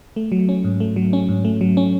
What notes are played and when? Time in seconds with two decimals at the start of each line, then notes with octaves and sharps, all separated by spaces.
0.16 A3
0.32 F#3
0.49 C#4
0.64 G#2
0.80 A3
0.96 F#3
1.13 C#4
1.28 G#2
1.45 A3
1.61 F#3
1.77 C#4